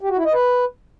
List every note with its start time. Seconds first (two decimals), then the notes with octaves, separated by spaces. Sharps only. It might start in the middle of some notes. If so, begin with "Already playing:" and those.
0.01 G4
0.09 F#4
0.17 E4
0.25 D#5
0.33 B4